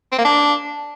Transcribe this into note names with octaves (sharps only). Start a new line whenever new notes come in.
C4
A#3
D4